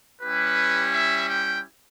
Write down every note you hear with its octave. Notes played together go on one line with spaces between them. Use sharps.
G3 C#4 E4 G4 B4
E5
G5